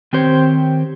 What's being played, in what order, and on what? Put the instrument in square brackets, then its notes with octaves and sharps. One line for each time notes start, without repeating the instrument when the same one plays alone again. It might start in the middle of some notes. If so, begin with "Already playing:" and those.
[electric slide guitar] D#3 C4 G4 C5 C#5